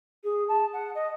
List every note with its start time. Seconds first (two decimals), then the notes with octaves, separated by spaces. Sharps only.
0.24 G#4
0.48 A5
0.73 F#5
0.95 D#5